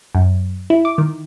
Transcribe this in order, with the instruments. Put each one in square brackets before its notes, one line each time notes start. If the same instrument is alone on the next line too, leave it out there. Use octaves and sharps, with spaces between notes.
[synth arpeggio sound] F#2
E4
D6
D#3